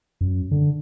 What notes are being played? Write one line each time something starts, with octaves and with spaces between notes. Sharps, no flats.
F#2
D3